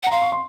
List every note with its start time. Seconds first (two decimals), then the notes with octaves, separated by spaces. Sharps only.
0.03 F#5
0.07 A#5
0.11 F5 C6
0.22 C#6
0.32 C6